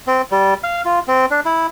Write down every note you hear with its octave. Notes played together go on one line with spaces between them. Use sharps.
C4
G3
F5
F4
C4
D4
E4